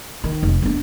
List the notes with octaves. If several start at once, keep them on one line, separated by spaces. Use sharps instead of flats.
D#3
F1
B3 D4